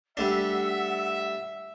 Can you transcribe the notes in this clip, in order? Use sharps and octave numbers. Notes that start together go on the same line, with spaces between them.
G3 A3 D4 E5 F#5 E6